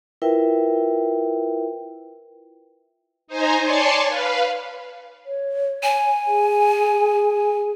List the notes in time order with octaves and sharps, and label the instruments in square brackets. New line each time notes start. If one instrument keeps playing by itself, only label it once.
[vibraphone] E4 F4 A#4 B4 E5 G5
[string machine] D#4 C5 G#5 A#5
C#5 D5 G#5 A5 C6 C#6
B4 F5
[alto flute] C#5
[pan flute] G#5
[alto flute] G#4